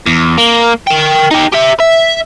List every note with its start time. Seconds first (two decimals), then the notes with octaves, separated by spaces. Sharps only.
0.06 E2
0.38 A#3
0.87 A#4 G5
1.31 D#4 G4
1.53 G4 E5
1.80 E5